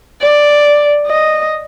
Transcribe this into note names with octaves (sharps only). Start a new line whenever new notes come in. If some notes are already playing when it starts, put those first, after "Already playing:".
D5
D#5